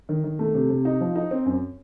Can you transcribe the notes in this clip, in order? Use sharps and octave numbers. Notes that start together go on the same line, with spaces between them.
D#3
D#3
A3
C3
C3
D#4
F3
D#4
C4
F#2